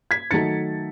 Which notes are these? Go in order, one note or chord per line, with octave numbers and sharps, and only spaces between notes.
G#6 B6
D#3 F#3 A3 D#4 A6 C#7